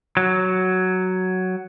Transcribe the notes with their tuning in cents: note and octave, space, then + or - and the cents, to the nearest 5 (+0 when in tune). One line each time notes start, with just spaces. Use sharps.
F#3 +5